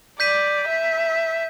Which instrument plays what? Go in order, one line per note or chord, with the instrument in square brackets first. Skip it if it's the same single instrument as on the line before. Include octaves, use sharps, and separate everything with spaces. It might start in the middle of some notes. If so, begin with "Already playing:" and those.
[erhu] D5 [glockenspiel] G6 B6 D#7
[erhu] E5